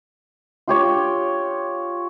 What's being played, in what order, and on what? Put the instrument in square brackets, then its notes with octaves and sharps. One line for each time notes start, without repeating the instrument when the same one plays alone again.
[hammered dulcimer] F4 G4 C#5 G5